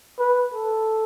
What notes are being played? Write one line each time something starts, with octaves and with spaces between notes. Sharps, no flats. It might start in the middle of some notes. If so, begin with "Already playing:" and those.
B4
A4